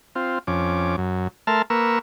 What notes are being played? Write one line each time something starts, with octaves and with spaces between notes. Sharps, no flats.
C4 F4
F2 C#4 D6
F#2
A3 A#4 E5 A5 C6 F6
A#3 A#4 B4 C#6 E6